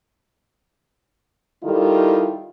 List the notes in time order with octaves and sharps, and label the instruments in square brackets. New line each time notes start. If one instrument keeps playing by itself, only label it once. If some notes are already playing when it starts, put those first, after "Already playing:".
[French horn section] D#3 G3 E4 F4 A4